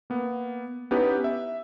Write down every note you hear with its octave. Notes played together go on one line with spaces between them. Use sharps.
A#3 B3
B3 C#4 D#4 E4 G4 B4
E5